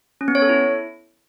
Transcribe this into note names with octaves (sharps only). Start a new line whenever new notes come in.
C#4
B3
C#5
A4
E4